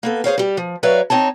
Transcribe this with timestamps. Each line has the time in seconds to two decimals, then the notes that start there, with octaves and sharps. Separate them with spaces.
0.03 A#3 B3 A4
0.24 G#4 C5 C#5 F5
0.38 G3 G4
0.57 F3
0.83 F#3 B4 C#5 D5 E5 F5
1.10 C4 D#4 C#5 A5